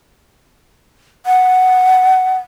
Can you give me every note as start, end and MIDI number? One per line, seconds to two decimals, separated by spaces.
1.26 2.37 78